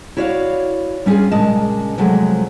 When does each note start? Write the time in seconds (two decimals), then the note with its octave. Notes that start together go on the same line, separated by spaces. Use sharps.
0.17 E4 F#4 C#5 D5 F5
1.06 G3 C#4 E4 F4 G#4
1.31 A#2 C#3 G#3 D#5 A5
1.98 C3 F3 F#3 G#3 A3